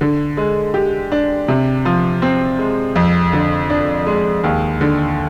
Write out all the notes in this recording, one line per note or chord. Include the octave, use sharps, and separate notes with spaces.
D3
G#3
G4
D4
C3
F3
C4
G#3
F2
D3
D4
G#3
D#2
D3